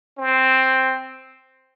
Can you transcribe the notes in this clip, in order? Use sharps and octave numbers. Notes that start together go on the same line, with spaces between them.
C4